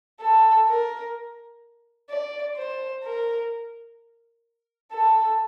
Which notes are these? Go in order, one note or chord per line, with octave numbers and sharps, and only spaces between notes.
A4
A#4
D5
C5
A#4
A4